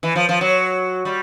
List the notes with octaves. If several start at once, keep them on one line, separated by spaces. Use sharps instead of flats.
E3
F3
F3
F#3
G3